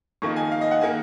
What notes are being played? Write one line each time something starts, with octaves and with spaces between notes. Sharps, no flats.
F2 D#3 A#3 C#6
G#5
F5
D#5
F#5
D#3 A#3 G#5